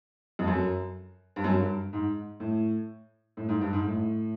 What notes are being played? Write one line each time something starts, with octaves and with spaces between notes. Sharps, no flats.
F2
F#2
G2
F#2
G2
G#2
A2
A2
G#2
G2
G#2
A2